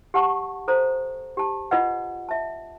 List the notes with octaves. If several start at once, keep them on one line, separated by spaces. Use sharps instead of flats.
G4 F#5 A5 C#6
A4 C5 A#5
G4 A5
F4 B4 D#5 F#5
E5 A5